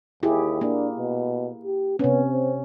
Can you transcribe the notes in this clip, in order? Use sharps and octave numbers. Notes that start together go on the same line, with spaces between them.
D#2 E4 G4 G#4
A#3 D4
B2
G4
C3 B3 C#4
C4